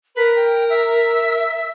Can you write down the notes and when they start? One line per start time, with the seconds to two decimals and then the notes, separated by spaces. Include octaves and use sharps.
0.15 A#4 B4
0.36 G5
0.69 E5